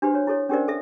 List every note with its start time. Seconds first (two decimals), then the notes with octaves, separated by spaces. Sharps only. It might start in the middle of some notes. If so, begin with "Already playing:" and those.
0.02 D4 F#4 G4 B4 C5
0.15 C#5
0.27 E4 G4 A4 C#5
0.49 C#4 D4 G4 A#4 C5 D5
0.68 A4 E5